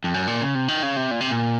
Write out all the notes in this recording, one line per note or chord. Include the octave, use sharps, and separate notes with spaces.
F2
F#2
A#2
C#3
C3
D#3
C#3
C3
A#2
C3
A#2